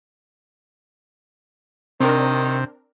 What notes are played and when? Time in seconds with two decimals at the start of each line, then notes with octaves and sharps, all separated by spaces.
2.00 C3 D#3 C4 D4 A#4